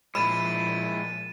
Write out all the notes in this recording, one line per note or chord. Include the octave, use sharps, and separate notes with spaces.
A#2 F3 G#3 E4 B5 A6 D#7 E7